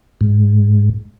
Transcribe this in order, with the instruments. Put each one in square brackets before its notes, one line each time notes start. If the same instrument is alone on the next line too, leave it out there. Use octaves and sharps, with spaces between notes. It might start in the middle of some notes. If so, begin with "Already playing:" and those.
[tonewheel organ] G#2